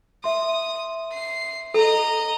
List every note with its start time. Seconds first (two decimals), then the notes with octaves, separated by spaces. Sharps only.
0.24 E5 C6 D#6
1.12 C7
1.74 A4 D#5 A#5